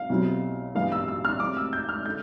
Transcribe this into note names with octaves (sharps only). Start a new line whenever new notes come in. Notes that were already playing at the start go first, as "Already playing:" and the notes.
Already playing: F5
B1 B2 G3 C4 E4
G2 E3 G3 B3 D4 F5
E6
E6
F6
A2 G3 C4 D6
E6
G6
F6
D3 A3 G6